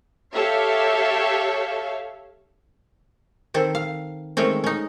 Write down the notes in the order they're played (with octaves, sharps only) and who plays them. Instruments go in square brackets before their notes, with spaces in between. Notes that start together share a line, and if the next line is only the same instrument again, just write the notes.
[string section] G4 A4 C#5 E5 F5
[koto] D#3 C4 A4
F5
D#3 G#3 A3 C4 C#4
C#4 D#4